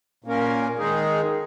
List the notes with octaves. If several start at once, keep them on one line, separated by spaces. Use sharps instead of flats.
A#2 A#3 C#4 A#4
D#3 G#3 D#4 G#4